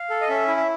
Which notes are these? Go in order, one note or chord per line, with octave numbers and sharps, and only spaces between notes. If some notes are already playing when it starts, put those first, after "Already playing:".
Already playing: F5
A4
D#5
C#4 E5
E4
E5